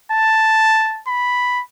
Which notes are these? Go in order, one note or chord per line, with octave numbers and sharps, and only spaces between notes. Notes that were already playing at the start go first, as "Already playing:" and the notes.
A5
B5